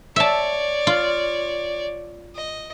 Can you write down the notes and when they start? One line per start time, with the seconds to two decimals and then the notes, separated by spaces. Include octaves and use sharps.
0.16 C#5 D5 E5 A5
0.87 F4
2.35 D#5